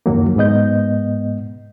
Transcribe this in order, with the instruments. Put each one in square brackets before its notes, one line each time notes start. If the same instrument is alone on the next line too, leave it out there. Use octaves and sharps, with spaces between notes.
[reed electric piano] C#2 F#2 D#3 F#3 A#3
G#2 G#3 B3 D#5 G6